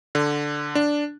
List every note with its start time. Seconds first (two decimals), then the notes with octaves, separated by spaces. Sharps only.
0.15 D3
0.75 D4